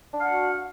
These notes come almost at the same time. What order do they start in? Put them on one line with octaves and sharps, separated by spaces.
D4 F5 F#5 F#4